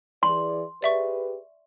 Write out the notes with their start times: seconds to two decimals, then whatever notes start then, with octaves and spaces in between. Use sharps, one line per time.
0.23 E3 G#4 D5 C6
0.82 G4 G#4 B4 D5 E5 C#6